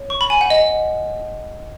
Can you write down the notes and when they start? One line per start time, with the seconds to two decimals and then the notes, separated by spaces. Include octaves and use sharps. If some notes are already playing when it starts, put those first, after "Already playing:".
Already playing: C#5
0.10 C#6
0.21 B5
0.30 G#5
0.41 F#5
0.50 D#5